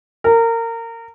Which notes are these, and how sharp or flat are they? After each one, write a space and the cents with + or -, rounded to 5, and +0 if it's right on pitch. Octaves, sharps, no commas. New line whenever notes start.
A#4 -25